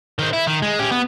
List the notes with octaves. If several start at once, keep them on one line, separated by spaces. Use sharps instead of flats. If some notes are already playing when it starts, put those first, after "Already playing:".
D#3 C4
E4
D#3
G#3
C#4 G4
B3